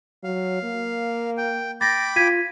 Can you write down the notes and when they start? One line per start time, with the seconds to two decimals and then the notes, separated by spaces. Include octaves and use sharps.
0.24 F#3 F5
0.63 A#3
1.37 G5
1.81 G5 B5 D6 A6 A#6
2.16 F4 G#6 B6 D#7